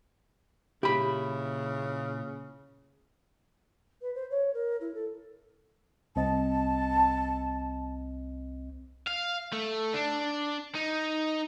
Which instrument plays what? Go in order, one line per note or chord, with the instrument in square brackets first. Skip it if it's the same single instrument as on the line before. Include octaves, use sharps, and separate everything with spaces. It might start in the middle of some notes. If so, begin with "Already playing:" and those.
[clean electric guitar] A#2 E4 [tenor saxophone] C#3 [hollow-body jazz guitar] G4 B5
[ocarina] B4
C5
C#5
A#4
E4
A4
[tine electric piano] C2 C4 D#5 [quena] A5
[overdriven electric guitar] F5
A3
D4
D#4